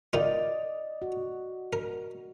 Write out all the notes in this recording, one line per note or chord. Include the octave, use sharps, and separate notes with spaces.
D#3 D#4 F4 D5 D#5
F#4
A#4